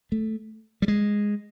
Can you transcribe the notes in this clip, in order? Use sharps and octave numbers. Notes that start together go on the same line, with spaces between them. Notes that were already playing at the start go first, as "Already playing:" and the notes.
A3
G3
G#3